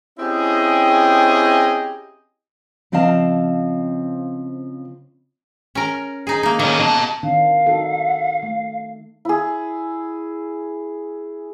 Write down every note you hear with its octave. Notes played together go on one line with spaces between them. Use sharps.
C4 C#4 E4 G4 G#4 D#5
C#3 F3 C4 D#5 F5 A5
C#4 A#4
D#4 G#4
A#3 D#4
D#3 A#3 C#4
B2 A5
D#3 C4 D4 F5
D#4 F#4 A4
A3
E4 G#4